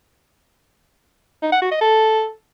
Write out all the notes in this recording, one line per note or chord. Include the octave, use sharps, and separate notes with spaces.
D#4
F#5
F#4
D#5
A4